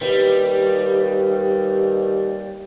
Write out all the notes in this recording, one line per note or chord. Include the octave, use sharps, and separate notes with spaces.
D#2 G3 B4